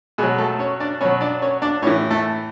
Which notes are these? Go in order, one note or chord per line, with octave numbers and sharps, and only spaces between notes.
B2 F#3 G#3 G#4
A3 A4
C#4 C#5
D4 D5
B2 F#3 C#4 C#5
D4 D5
C#4 C#5
D4 D5
A2 E3 C#4 C#5
A3 A4